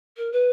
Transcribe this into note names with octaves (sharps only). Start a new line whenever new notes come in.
A#4
B4